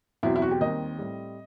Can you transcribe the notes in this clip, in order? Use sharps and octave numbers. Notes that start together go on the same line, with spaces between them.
E2 B2 F#3 C4 E4
E4
F#4
G4
D#2 D#3 G3 C4 D#5
A2 G3 C4